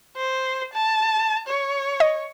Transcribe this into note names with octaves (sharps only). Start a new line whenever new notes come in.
C5
A5
C#5
D#5